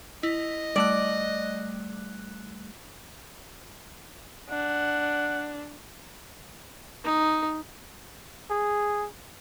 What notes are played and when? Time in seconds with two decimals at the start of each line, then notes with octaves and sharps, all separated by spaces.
0.23 E4 D#5
0.76 G3 A3 D5 F#6
4.50 D4 F#5
7.04 D#4
8.50 G#4